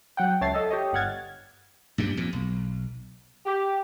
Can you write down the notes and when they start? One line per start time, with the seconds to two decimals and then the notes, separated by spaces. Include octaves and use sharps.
0.17 F#3 F#5 G5
0.41 C#2 C#5 E5 A5 A6 C7
0.54 A4 D#5 E5
0.70 G4 C#5 D#5
0.93 G1 G2 F#5 F6 G#6 A6
1.98 G2 A#2 G3
2.17 F2 A#2
2.33 B1
3.46 G4